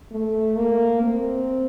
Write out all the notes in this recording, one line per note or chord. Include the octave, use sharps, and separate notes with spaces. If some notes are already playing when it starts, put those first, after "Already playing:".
A3
A#3
C4